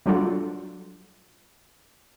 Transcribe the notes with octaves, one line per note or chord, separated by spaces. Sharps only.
F#3 G3 D4 F4 F#4 A4